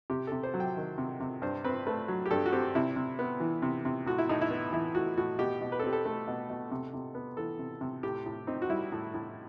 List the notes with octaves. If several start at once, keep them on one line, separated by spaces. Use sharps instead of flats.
C3 G4
C3 A4
C5
F#3
G5
D#3
C3
C3
G2 C5
C4 B4
A3 B4
F#3
G4
G2 A4
F#4
C4 G4
C3 E4
C3
B3
E3
C3
C3
A2 F#4
E4
A2 D#4
E4
B3
E3 E4
A2 F#4
A2 F#4
B2 G4
B2
B4
A4
C4 G4
A4
A3
B2
B2
C3
C3
B3
E3 A4
C3
C3
A2 G4
A2
C4 D#4
F#4
G3 E4
A2
A2